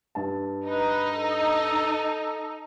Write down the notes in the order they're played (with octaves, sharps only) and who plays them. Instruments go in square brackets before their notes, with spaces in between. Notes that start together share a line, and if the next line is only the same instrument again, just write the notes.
[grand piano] G2 A5
[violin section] D#4 [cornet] B4
[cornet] A4